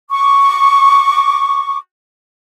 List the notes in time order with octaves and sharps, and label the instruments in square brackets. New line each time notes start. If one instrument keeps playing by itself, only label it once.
[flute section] C#6 D6